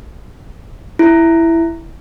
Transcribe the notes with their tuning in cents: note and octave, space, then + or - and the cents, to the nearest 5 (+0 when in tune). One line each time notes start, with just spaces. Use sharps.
E4 +5